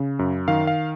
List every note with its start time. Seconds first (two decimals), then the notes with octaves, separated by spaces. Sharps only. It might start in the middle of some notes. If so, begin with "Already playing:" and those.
Already playing: C#3
0.19 F#2
0.48 D#3 F5
0.67 F5